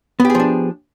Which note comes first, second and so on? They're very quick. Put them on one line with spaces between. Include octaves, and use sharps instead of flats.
B3 G4 G#4 F3 D4